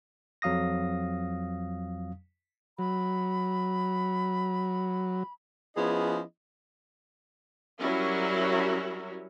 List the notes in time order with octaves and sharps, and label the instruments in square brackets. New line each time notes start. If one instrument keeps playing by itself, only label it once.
[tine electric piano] F2 F#3 F5 D#6 A#6
[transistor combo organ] F#3 [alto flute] B5
[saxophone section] F3 B3 C#4 E4 G#4 D#5
[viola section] F#3 G3 C#4 E4 F#4 A#4